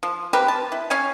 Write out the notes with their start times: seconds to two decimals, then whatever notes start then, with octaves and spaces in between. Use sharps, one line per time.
0.03 F3
0.33 C4 G4 A#4 B4
0.48 A5
0.72 E4
0.90 C#4 C#5 F5 G#5